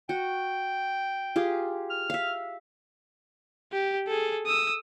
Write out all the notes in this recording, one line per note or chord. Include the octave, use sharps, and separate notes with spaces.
F#4 G5
F4 G4 G#4
F6
E5 F5
G4
G#4 A4
D#6 E6